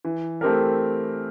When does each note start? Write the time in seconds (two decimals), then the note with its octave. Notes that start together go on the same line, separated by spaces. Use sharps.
0.05 E3
0.41 A3 C4 G4 A#4